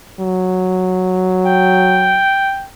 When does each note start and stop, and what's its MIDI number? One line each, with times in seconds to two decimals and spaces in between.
0.20 2.24 54
1.45 2.65 79